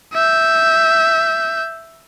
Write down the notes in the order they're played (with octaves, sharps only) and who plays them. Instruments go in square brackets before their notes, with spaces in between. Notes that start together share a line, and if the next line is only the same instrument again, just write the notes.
[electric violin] E5 G6